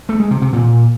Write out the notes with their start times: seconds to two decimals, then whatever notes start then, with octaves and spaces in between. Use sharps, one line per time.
0.09 A3
0.20 G#3
0.31 C3
0.42 C3
0.53 A#2